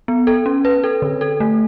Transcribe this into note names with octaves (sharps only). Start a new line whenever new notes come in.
B3
A4
C#4
B4
A4
D3
A4
A3